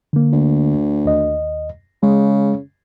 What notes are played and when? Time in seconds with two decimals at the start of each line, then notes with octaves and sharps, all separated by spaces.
0.13 D3 A#3
0.32 D2
1.05 D#2 D#5
2.03 C#3 G#3